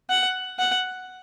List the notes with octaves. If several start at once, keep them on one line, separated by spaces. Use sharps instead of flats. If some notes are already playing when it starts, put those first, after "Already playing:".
F#5
F#5